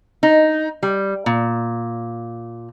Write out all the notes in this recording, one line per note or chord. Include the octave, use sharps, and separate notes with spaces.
D#4
G3
A#2